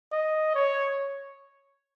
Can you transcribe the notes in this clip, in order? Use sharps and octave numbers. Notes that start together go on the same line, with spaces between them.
D#5
C#5